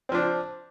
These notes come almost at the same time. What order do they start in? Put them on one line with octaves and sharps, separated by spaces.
C4 F3 D4